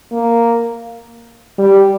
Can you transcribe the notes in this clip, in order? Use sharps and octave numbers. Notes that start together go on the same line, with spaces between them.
A#3
G3